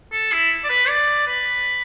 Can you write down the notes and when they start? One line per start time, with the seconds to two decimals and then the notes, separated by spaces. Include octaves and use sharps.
0.12 A4
0.32 E4
0.64 D5
0.69 B4
0.88 D5
1.27 B4